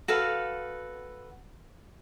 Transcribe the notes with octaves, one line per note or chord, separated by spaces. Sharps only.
F#4 A4 B4 F5